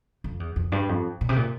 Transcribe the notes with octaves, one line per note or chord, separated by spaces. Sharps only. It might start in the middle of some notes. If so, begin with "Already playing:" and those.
F2
E2
F2
G2
F2
A#2
C3
A#2